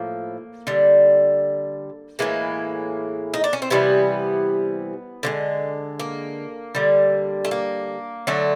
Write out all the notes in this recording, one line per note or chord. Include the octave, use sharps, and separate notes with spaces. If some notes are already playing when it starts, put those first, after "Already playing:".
Already playing: A2 F3 A#3
D3 G3
A2 E3 G#3 A#3
D#4
D4
C#4
C4
C3 E3 G3 B3
D3 F3 G#3
A#3
D3 G3
A3
A#3
D3 F#3 A3